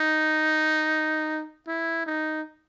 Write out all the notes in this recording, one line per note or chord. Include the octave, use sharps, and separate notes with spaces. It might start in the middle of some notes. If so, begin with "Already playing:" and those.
Already playing: D#4
E4
D#4